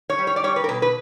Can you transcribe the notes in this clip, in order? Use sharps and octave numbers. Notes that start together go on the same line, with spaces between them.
C#5
G3
C#5
D5
G3 C#5
B4
A#4
B2 B4
B4